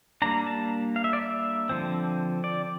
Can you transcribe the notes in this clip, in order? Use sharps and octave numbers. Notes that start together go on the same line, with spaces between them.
G3 A#3 D4 A#5
A5
F5
E5
D5
E5
D3 F3 C4
D5